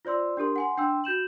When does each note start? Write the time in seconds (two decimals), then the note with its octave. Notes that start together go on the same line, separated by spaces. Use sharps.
0.05 F4 C5 D5 C6 E6
0.37 D4 G4 A#4 C6
0.56 F#5 G#5 C6
0.77 D4 G5 C6 E6
1.04 F#4 G6 E7 F#7